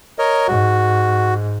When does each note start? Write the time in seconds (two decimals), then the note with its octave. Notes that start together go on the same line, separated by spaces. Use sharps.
0.19 A#4 C#5 D#5
0.48 G#2 F#4